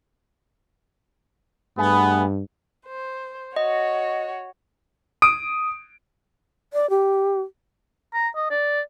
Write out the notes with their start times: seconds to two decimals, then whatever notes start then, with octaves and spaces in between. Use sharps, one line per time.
1.78 G2 A3 B3 G#4
2.85 C5
3.56 F#4 C#5 D#5
5.22 D#6 D7
6.73 D5
6.90 G4
8.14 A#5
8.36 D#5
8.51 D5